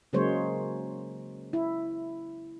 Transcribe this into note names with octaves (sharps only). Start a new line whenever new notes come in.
C#3 F#3 G#3 A#3 C5 C#5
E4